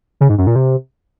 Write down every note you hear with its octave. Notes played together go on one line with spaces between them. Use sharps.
C#3
G#2
F#2
A#2
C3